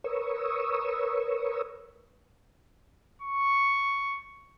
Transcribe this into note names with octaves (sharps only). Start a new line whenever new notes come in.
A#4 B4 C#5 C#6 D#6 E6
C#6